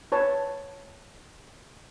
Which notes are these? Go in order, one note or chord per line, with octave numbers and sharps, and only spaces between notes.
B4 C#5 A5